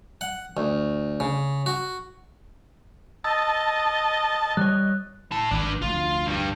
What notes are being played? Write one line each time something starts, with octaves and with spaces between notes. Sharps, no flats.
F#5
D2
C#3
F#4
D#5 A5 D#6 E6 A6
G3 C#5 F#6
E4 A5
G#1 D4 B4
F1 D2 F4
G2 G3